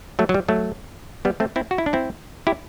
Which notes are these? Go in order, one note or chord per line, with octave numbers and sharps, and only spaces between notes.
F#3 A3
F#3
G3
F#3 A3
G3 B3
A3 C4
C4 E4
F#4
E4
D4
C4 E4
E4 G4